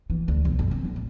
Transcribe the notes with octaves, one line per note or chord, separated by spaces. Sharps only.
E3
D2
B1
F#2
C4
F#3
A1